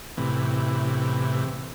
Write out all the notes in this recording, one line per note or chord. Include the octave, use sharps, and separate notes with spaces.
A2 C3 E3